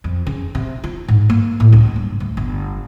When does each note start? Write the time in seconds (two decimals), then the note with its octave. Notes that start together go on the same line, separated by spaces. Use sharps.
0.04 F2
0.27 C#3
0.55 C3
0.84 F4
1.08 G#2
1.30 A#3
1.60 A2
1.73 C#2
1.96 G2
2.20 D2
2.37 G1